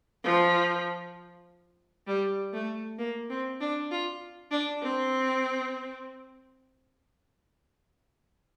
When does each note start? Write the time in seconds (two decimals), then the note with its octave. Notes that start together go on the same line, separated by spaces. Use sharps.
0.24 F3
2.07 G3
2.53 A3
2.99 A#3
3.30 C4
3.61 D4
3.91 F4
4.51 D4
4.82 C4